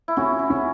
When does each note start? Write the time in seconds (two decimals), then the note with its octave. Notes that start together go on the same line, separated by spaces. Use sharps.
0.08 E4
0.17 C#4 F#4
0.39 E4
0.50 C#4